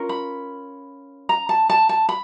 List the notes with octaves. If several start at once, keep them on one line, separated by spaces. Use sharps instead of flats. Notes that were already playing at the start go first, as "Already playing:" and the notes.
Already playing: C#4 F4 A#4
B5
A#5
A5
A5
A5
B5